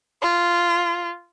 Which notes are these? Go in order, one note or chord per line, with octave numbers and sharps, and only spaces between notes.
F4